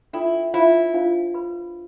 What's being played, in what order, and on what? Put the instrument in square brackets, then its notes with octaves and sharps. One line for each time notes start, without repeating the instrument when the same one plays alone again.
[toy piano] D4 F4 A4 D5 G5 [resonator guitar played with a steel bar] E4
[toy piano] D4 F4 C5 F5 [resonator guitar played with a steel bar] E4
[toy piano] D4 F4 C5 F5
B4 E5 B5